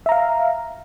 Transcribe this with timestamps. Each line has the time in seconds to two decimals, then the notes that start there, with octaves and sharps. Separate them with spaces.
0.06 E5
0.09 A#5
0.12 F5